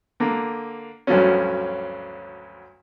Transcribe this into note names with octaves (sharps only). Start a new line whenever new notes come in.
D3 A#3
D2 G2 D3 F3 F#3 C#4